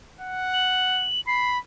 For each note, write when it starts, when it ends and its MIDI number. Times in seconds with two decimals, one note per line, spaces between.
0.21 1.08 78
0.53 1.21 102
1.27 1.59 83
1.27 1.50 96